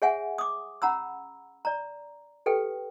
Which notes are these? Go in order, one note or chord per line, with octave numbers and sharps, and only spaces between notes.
G#4 C#5 E5 F#5 G#5
D6 D#6
C#4 F#5 A#5 B5 E6
D5 A#5
G4 A4 B4 G5